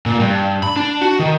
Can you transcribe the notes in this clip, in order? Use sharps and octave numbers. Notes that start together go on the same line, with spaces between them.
A#2
G2
B5
D4
F#4
D#3